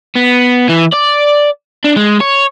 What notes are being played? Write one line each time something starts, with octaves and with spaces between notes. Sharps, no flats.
B3
E3
D5
D4
G#3
C#5